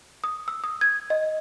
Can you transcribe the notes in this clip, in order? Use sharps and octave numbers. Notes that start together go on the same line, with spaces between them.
D#6
E6
D#6
G#6
D#5